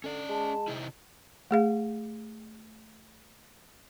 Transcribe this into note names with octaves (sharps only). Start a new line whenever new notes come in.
D3 C#4 D5
G#3 A5
C3 D#4 E4
A3 G#4 F5